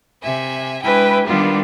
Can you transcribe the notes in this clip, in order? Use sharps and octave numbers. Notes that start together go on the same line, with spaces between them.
C3 E5 G#5
G#3 D4 E4 B4 G5 G#5
D#3 G3 B3 D4 F4